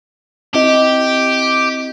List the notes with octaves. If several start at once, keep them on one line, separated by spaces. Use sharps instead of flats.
C4 E4 G4 D#5